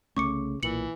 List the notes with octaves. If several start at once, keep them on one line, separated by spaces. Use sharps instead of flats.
C2 C#3 A3 C#4 C#6 D6 C#7
B1 A#2 E3 C#7 F#7